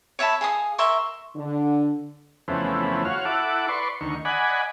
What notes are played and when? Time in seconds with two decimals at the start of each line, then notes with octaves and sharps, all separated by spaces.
0.19 C#5 E5 A5 B5
0.41 G#4 F5 D#6
0.78 A#4 E5 C6 C#6
1.35 D3
2.48 F2 C#3 E3 A3 B3 C4
3.05 F#4 C#5 F5
3.25 E4 A4 F#5 D6
3.68 B4 D5 C6 C#6
4.01 D2 D#3 C#6
4.25 D5 D#5 F#5 G#5 B5